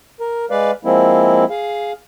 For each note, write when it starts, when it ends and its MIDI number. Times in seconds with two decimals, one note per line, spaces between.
0.20 0.45 70
0.50 0.71 56
0.50 0.71 71
0.50 0.71 74
0.50 0.71 77
0.85 1.44 53
0.85 1.44 56
0.85 1.44 58
0.85 1.44 60
0.85 1.44 64
1.50 1.93 68
1.50 1.93 77